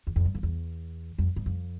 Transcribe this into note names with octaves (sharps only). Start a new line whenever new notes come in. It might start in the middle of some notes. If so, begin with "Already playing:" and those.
E2
F2
G2
F2
E2
F2
G2
F2